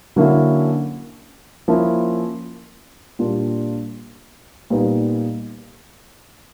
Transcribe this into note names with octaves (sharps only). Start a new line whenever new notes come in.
D3 F#3 A#3 C#4 E4
F3 A#3 C#4 E4
A#2 G3 A#3 D4 F4
A#2 G3 B3 D#4